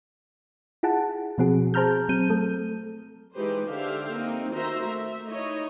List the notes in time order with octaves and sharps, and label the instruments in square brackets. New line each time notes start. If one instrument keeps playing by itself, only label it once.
[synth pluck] E4 F4 G#4 F#5 A5
B2 F3 C4 F#4 G#4
G#4 C5 A5 A#5 F6 G6
F#3 C4 G6 D#7
A3 A4
[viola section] E3 G#3 D#4 G4 B4 C5
D3 D4 G4 C5 E5 F5
A#3 C4 D#4
D#3 F#4 A#4 C5 E5 A#5
A3 E5
D#4 E4 C#5 D#5